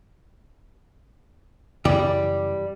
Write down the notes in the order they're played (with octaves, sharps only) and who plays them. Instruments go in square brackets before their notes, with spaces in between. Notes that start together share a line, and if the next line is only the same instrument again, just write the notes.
[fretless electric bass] F#2 C#3 E3 [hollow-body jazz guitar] G3 D5